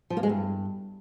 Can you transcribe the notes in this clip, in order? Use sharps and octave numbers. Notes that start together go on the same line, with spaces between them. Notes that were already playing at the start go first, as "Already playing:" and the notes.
F3
A#3
G#3
G2